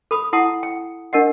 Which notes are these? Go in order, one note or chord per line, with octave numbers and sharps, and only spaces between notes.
A4 B5 D#6
E4 F#5 A5 D#6
G5
D4 A#4 D#5 F#5